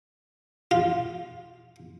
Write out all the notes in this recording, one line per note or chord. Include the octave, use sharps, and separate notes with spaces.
F4